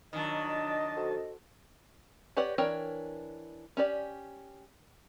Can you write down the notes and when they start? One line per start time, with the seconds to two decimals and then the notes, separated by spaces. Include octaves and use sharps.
0.13 D#3 F#3 D4 D#5 A5
0.97 F#4 A4 C5
2.37 G4 B4 C#5 D5 F#5
2.58 E3 D4 A#4 C#5 G5
3.77 C#4 G4 D5